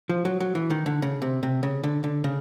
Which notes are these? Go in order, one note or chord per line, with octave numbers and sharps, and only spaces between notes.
F3
F#3
F#3
E3
D#3
D3
C#3
C3
C3
C#3
D3
D3
C#3